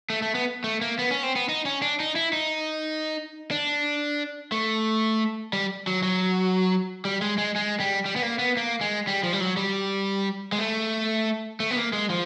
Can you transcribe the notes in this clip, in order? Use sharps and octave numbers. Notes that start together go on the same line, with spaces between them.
A3
A3
B3
A3
A#3
B3
C#4
C4
B3
D#4
C#4
D4
D#4
E4
D#4
D4
A3
G3
F#3
F#3
G3
G#3
G#3
G#3
G3
G3
B3
A#3
B3
A#3
G#3
G3
F3
G3
F#3
G3
G#3
A3
A3
B3
A#3
G#3
F3